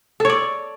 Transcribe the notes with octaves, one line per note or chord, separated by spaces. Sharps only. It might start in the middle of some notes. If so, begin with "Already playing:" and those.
A4 C#5 D5